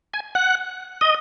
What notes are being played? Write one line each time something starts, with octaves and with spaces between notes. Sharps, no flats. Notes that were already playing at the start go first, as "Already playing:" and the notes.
G#5
F#5
D#5